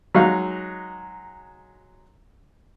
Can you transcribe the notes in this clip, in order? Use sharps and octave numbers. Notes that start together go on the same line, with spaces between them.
F#3 G#3 D#4 F5